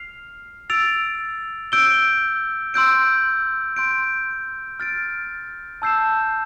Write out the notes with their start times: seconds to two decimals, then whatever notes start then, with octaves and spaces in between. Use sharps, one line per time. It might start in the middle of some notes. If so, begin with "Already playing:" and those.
Already playing: F6 C7 F7
0.70 E6 A6 D7 F7
1.72 E6 G6 D7 G7
2.74 C6 E6 G6 D7
3.76 C6 G6 D7
4.80 F6 A6 D7
5.82 A5 E6 G6 C7 E7